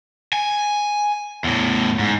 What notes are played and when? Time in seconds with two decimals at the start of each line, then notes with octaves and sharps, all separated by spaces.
0.33 G#5
1.44 E2 A2
1.99 G#2